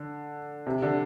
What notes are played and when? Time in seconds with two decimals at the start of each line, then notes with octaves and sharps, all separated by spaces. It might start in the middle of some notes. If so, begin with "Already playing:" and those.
Already playing: D3
0.67 C3
0.82 D3